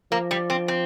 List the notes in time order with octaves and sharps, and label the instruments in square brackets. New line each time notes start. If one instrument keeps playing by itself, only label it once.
[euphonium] F3 [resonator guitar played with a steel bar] A#3
[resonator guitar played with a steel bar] G3
C4
C4